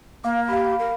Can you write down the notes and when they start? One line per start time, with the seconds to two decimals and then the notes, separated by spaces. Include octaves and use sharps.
0.24 A#3 F5 D6
0.49 G4 F5 B5
0.79 A#4